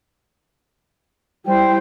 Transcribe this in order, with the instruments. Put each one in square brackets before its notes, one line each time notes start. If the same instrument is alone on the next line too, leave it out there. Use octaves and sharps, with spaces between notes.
[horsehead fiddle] G3 E4 [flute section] C5 G5